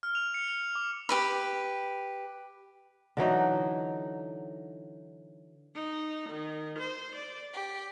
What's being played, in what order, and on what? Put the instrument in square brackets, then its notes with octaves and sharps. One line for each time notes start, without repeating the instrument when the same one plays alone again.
[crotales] F6
F7
C#7
F7
D6
[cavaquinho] G4 B4 B5
[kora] D3 E3 F#3 D#4
[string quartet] D#4
D#3
C5
D5
G4